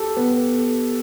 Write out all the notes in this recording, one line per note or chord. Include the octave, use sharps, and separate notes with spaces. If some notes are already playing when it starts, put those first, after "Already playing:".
Already playing: G4 A4
B3